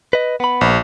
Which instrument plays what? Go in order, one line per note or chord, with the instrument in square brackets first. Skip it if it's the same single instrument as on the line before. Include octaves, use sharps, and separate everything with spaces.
[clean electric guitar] B4 D#5
B3 B5
[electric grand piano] A#1